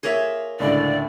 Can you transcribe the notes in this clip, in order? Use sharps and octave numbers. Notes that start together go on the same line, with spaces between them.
A#3 F4 G#4 C#5 E5 C6
C#2 A2 D3 D5